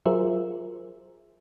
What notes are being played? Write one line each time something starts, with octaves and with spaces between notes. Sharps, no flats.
F#3 F4 G#4 A#4 C5 E5